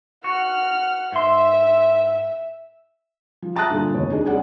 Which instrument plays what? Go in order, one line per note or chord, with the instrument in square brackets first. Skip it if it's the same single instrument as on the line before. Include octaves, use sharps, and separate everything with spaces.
[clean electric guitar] F#4 [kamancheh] F#5 F6
[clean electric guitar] G#2 C6 [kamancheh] E5
[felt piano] F3
E5 A5 A#5 D#6 F#6 A6
G2 A#2 D3
F1 D#2 C#5
D4 D#4 G#4
C2 G#3 C#4 G#4 D5 F#5